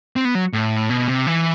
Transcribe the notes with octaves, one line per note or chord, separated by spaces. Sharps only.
C4
B3
F#3
A2
B2
C3
E3